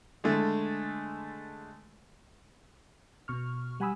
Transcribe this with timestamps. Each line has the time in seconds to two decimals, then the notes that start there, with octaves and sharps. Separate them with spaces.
0.24 D3 G#3 A3
3.28 B2 C#6 F6
3.80 G3 F#5 G#5 B5 D#6 E6